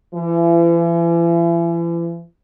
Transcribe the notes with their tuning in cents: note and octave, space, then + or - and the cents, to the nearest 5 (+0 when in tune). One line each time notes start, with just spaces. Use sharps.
E3 +40